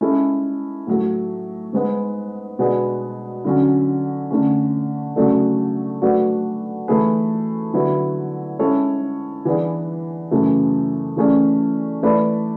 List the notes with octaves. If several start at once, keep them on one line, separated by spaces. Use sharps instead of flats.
G#3 C#4 E4 A4
A2 F#3 A3
G#2 G#3 B3
B2 G#3 B3 D4 G#4
D3 F#3 C#4
D3 A3 C#4
C#3 F#3 A3 D4 A4
F#3 A3 D4 F#4 B4
E3 A3 E4 G#4 B4
D3 F#3 B3 E4
G#3 C#4 E4 A4 C#5
E3 B3 D4 G#4
F#2 C#3 E3 A3
E3 A3 C#4 G#4 D5
E3 A3 E4 B4 D5